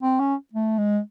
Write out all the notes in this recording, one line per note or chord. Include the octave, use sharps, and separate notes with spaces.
C4
C#4
A3
G#3